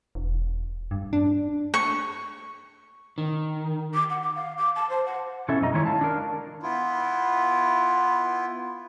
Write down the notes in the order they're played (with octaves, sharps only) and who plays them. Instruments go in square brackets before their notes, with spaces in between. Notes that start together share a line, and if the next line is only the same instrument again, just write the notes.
[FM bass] E1
G2
D4
[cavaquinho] C#6
[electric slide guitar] D#3
[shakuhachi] D6
F#5
D6
F5
D6
A5
C5
F#5
[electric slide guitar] B2 C#4 E4 A4 E5
F#2 G3 D#5 A#5
D#3 G#3 E4 F4 C#5
F5 A5
D4 A#4
[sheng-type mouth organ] B3 E4 F4